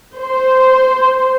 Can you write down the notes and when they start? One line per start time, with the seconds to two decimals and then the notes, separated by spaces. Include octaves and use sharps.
0.17 C5